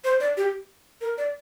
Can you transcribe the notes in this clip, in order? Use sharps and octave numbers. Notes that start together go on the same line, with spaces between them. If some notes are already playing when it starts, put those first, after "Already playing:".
C5
D5
G4
A#4
D5